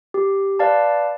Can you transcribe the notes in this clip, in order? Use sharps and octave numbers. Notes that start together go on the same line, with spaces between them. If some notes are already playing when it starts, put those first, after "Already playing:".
G4
B4 D5 F5 A5